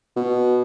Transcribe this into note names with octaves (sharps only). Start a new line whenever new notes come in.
B2